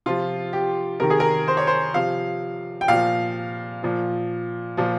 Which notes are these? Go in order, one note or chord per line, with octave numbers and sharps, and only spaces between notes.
C3 F3 F4
G4
C3 D#3 A#4
G#4
A#4
C5
C#5
C5
C3 F3 F5
G5
A#2 F3 F5
A#2 F3
A#2 F3